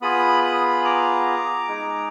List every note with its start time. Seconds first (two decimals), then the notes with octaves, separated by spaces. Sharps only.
0.01 B3 F4 G#4 B5 D#6
0.43 B5 D#6
0.85 A#5 D6
1.69 G#3 D#4 G#4